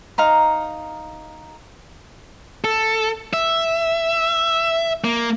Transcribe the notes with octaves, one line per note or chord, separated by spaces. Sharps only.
D#4 F5 A#5 C6
A4
E5
A#3